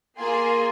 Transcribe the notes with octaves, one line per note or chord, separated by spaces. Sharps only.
A#3 F4 G#4 G#5 C6